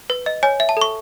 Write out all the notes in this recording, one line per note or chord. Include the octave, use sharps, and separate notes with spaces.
B4
D#5
C#5 G#5
E5
A5
A4 C#6